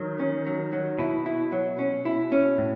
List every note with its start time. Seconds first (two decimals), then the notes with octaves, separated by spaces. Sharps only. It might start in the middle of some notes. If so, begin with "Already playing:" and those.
Already playing: D#3 F#3
0.20 C#4
0.47 F#3
0.73 F#3
0.99 B2 E4
1.26 E4
1.52 F#3
1.79 C#4
2.05 E4
2.32 C#4
2.58 A2